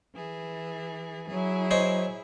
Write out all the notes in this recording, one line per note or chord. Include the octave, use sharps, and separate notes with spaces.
E3 G#4
F#3 E4 G#4
C5 C#5 D#5